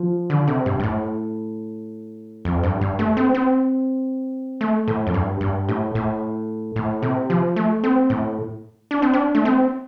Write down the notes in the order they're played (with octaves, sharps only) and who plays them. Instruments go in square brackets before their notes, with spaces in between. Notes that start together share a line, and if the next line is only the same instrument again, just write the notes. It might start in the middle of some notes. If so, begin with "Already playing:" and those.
Already playing: [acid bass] F3
D3
C3
G2
G2
A2
F2
G2
G2
A3
C4
C4
A3
A2
F2
G2
G2
A2
A2
A2
C3
F3
A3
C4
A2
D4
C4
D4
A3
C4